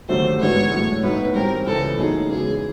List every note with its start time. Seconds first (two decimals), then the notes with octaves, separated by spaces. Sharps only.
0.09 D#2 D3 F#3 A3 C5
0.40 G#2 E3 G#3 B3 D4 C#5
0.72 A2 F#3 A3
1.03 A2 F#3 B3 D#4 B4
1.35 A2 E3 G3 C4 A#4
1.66 C#2 C#3 E3 A4
1.98 A2 F#3 A#3 D#4 G#4
2.29 E2 C#3 E3 G#3 G#4